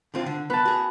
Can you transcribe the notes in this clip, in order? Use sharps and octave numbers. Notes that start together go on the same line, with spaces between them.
D3 C4 F4
D3
B3 B4 A5
F#4 G#4